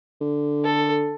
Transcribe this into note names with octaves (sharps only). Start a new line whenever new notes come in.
D3
A4